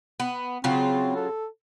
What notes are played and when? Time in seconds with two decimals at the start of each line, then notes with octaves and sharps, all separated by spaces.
0.20 B3
0.64 C#3 F#3 C4 F4
1.16 A4